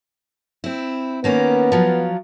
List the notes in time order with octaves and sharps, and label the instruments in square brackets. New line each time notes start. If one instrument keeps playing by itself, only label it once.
[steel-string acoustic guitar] C4 E4
[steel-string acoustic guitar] D#3 A#3 C#4 [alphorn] B3
[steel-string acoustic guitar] F3 F#3 F4